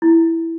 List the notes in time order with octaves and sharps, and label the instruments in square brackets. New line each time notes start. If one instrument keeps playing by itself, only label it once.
[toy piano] E4